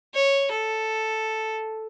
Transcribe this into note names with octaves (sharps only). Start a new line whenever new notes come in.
C#5
A4